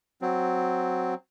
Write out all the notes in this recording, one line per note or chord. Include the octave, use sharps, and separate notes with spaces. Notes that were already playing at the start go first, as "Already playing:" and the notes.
F#3 C4